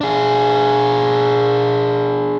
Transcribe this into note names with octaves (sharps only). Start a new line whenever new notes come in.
D4 G#4